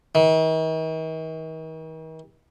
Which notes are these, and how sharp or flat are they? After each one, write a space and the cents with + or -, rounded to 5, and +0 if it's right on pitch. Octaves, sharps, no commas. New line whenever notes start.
D#3 +45